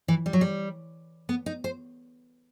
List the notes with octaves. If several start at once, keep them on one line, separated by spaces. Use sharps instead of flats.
E3
G3
F#3
G3
B3
D#4
C5